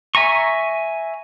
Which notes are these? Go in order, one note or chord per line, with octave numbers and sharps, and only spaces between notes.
E5 G#5 A#5 C#6